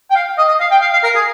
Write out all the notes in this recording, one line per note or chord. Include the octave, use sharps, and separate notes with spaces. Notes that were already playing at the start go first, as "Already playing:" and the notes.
G5
F5
D#5
D#5
F5
G5
F5
F5
A#4
G#4